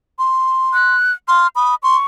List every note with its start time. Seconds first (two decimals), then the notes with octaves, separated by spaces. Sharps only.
0.19 C6
0.74 F#6
1.28 C6 F6
1.56 B5 D#6
1.83 C6 C#6